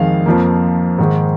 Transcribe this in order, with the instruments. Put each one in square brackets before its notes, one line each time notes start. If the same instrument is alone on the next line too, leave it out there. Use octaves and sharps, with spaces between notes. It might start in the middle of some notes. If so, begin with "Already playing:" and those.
Already playing: [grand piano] F2 D#3 G#3 F5
F2 F3 A#3
G#2 D#3 G#3